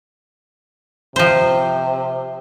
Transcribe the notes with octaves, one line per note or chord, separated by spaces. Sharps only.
C3 F3 C5